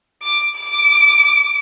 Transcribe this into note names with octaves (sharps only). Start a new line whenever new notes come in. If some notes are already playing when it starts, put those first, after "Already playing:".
D6
D6